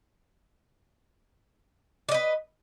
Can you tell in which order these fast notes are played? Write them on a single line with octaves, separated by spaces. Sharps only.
D5 D#5 B4